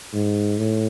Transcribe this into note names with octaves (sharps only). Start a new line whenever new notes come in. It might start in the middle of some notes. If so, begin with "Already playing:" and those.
G#2
A2